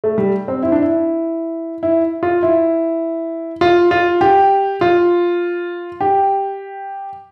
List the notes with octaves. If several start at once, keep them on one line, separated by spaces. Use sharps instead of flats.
A3
G3
C4
E4
D4
E4
E4
F4
E4
F4
F4
G4
F4
G4